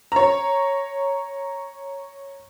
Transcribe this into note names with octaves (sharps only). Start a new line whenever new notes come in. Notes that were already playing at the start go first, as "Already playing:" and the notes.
C#5 A#5